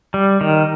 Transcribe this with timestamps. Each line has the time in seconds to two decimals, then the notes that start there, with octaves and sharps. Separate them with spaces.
0.14 G3
0.41 D#3